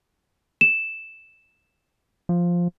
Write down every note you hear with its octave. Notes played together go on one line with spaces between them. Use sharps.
E7
F3